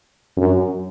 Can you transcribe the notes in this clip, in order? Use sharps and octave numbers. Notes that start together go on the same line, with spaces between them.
F#2